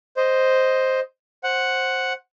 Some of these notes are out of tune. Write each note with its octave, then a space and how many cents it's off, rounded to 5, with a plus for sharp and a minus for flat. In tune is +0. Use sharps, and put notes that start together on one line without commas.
C5 +0 D#5 +0
C5 +15 F#5 +0